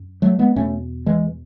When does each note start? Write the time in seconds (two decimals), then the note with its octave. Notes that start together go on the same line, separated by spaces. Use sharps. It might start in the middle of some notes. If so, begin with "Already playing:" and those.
Already playing: F#2
0.22 F#3 A3
0.39 G#3 B3
0.56 E2 B2 A3 C#4
1.06 E3 G#3